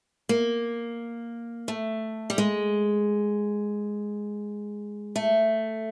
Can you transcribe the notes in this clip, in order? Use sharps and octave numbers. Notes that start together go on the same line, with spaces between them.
A#3
A3
G3
G#3
A3